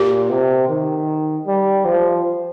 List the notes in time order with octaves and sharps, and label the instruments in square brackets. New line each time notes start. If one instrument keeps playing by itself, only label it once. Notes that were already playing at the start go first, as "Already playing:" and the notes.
Already playing: [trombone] A#2 [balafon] G4
[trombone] C3
D#3
G3
F3